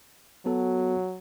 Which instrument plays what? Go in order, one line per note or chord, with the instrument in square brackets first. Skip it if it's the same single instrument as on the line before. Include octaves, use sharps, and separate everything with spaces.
[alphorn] F#3 [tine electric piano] B3 F#4 A4